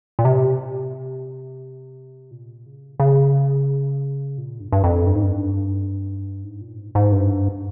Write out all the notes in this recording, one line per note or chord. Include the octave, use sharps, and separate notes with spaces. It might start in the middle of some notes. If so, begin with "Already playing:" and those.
A#2
C3
A#2
C#3
C#3
A#2
G2
G2
F2
G2
G#2
G2
G#2
A#2
G#2
G#2
G2